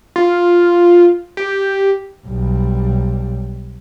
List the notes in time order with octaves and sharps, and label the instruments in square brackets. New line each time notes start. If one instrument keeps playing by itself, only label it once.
[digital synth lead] F4
G4
[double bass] B1 G3